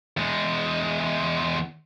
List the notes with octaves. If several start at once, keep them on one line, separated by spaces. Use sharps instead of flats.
E2 G#3